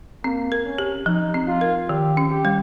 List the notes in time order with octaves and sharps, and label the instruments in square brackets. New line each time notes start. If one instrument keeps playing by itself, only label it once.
[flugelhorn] A#3 [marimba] C4
[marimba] A#4
[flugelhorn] C#4
[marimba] G4
[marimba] F3 [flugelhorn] D#4
[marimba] C4
[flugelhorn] F4
[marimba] A#4
[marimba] D#3 [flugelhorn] G4
[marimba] C#4
[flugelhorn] G4
[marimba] G3